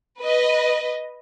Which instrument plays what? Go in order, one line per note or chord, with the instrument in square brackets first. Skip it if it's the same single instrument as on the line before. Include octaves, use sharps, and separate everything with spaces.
[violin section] B4 D#5